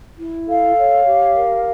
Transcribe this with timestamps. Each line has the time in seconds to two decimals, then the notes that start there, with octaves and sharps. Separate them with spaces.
0.17 E4
0.46 A4 F5
0.77 C#5
1.06 G4
1.34 A#4